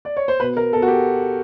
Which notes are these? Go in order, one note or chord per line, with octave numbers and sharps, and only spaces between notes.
D5
C#5
C5
B2 B4
A#4
B2 A4
F#4
G4